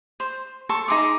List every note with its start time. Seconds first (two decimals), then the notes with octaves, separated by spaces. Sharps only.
0.20 C5
0.69 A4 A5 C6 C#6
0.88 D#4 G#4 C6 D6